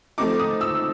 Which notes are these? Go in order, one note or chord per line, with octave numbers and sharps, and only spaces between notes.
F3 A3 C4 D#4 D6
D#6
E6